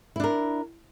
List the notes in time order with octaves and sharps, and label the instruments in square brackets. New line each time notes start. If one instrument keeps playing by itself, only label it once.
[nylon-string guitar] E4
D4
A#4